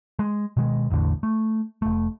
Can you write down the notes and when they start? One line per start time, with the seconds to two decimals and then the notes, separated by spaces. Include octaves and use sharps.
0.19 G#3
0.57 B2 D#3 G#3
0.90 A1 E2 A2 D3
1.23 A3
1.82 F1 A3